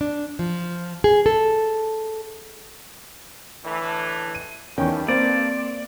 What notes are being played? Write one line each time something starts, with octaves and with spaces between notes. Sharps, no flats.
D4
F3
G#4
A4
A2 D3 E3
D#7
E2 G2 D#3 C#4 G5
A#3 C4 D5